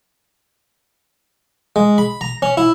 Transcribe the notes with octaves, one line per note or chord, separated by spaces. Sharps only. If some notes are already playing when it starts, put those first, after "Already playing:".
G#3
B5
A#5
C#4
E4